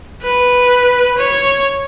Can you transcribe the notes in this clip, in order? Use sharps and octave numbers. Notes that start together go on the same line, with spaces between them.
B4
C#5